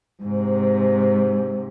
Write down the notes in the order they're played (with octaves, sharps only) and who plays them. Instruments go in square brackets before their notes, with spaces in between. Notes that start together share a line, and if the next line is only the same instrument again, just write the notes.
[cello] G#2 C3